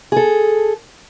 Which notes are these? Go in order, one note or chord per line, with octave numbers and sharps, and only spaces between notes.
G#4 A4